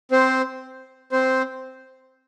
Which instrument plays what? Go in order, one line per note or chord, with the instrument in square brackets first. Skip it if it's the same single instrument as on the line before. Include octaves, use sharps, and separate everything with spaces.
[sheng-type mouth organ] C4 C5
C4 C5